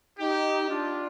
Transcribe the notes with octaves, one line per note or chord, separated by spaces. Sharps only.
D#4 G4
D4 F4